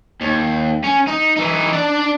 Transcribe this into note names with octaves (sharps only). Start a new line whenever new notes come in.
D#2
C#4
D#4
E3 D#4
D4 D5